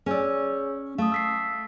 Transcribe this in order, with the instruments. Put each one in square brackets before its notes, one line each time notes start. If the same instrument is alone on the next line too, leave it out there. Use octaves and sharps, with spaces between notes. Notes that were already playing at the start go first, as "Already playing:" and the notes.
[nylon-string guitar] C#4 D5 [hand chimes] G#4 C#5 E6
[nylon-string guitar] A3 [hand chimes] F5 D#6
[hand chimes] E6 B6 C7